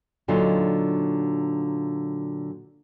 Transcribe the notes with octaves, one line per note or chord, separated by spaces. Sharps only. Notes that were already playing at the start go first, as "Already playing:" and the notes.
A#2 D3 F#3 D#4 F4